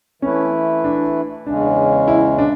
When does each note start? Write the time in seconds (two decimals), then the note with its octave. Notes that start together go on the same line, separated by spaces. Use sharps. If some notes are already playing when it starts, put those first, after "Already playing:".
0.22 E3 A3 C#4 E4 B4
0.84 D4
1.46 E2 C#3 G#3 C#4 D4
2.08 E4
2.38 D4